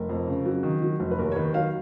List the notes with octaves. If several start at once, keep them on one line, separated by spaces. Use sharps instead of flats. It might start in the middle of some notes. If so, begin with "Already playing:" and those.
Already playing: F1 A#4
F2
C#3
F#3
D#3
F#3
F1
B4
D#2 A#4
C#5
D#3 B4
F#3 F5